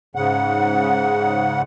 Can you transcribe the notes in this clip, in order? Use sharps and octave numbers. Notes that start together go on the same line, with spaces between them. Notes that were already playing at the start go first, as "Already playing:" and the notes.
G#2 C#3 F#5